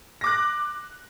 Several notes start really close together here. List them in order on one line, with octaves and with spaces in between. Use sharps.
A#6 D6 F#6